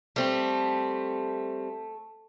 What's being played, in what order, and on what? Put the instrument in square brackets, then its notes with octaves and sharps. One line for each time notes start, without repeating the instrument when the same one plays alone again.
[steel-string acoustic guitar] G3 C4 [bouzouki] A3